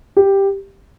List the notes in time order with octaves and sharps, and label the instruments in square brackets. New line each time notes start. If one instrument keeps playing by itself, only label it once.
[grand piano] G4